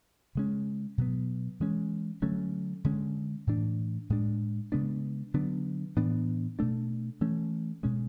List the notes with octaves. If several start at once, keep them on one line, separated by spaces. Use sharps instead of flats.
C#3 G#3 C#4
B2 F#3 B3
E3 G#3 C#4
D3 F#3 A3 C#4
D3 G#3 C#4
A2 E3 A3 D4
A2 G#3 D4
C#3 G#3 B3 D4
D3 F#3 B3 D4
A2 E3 B3 D4
B2 A3 D4
E3 A3 C#4
B2 G#3 C#4